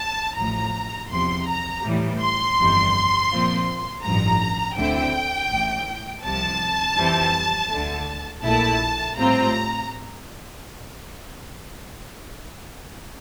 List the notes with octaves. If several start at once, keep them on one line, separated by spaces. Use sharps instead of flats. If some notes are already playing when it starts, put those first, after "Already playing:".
Already playing: A5
A1 A2 F3 A#5
E2 C3 F3 C6
A#5
A2 E3 G3
C6
G1 F2 E3 G3
A#2 F3 C4 F4
A1 G2 F3 A#5
D2 D3 A3 C4 E4 G5
A1 A2 E3
C2 C3 F3 A5
F2 E3 G3 C4
D2 D3 A3
A#1 A#2 A3 E4 A5
A2 G3 C4 F4 A#5